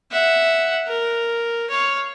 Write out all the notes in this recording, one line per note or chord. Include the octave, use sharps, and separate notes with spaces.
E5 F#5
A#4
C#5 F5